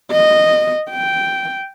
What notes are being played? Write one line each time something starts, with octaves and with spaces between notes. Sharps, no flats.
D#5
G5